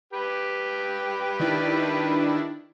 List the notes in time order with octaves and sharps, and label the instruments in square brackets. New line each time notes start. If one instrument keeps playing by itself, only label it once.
[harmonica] G4 B4 G5
[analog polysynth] D#3 D4 E4